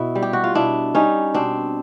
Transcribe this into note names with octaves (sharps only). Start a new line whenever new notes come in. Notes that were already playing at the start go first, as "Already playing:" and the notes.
Already playing: B2 E4
G3
G4
F#4
F4
B2 D4 E4
G3 C#4 D#4
B2 C4 D4